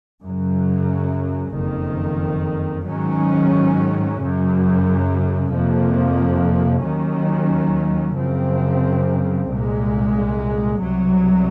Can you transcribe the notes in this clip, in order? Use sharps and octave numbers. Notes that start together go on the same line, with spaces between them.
F#2 C#3 F#3
F#1 F2 D#3
G#2 D#3 F#3 C#4
F#2 C#3 F#3
F2 C3 F3 A#3
D#2 D#3 F#3 C#4
F#2 C#3 F3 C4
C2 A#2 G#3
C2 C3 F#3